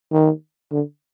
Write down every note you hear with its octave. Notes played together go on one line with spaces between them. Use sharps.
D#3
D3